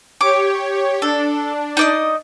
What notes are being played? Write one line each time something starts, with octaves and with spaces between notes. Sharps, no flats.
G4 C#5 D6
D4 A4
D#4 D5 D#5